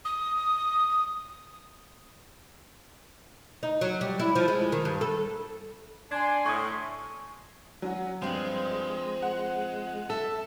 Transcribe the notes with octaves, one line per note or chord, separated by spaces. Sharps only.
D#6
D#4
F#3
G3
E4
F3
G#3
D#3
G2
A4
D4 G#5 C6 G#6
A2 C#6 D#6
F#3 C#4 F#4
G2 F3 G#3 C4
F#5
A4 E5 A5